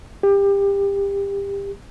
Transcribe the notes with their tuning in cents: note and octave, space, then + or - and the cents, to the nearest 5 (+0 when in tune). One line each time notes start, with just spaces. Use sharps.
G4 +25